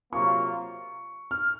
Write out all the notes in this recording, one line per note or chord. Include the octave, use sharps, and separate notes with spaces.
C3 F#3 A#3 F4 C#6
F6